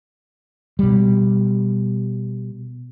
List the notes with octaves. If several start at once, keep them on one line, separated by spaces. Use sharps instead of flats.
B2 G3